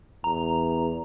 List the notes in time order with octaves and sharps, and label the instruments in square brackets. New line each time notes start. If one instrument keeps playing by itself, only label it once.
[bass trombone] E2 [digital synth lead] A#5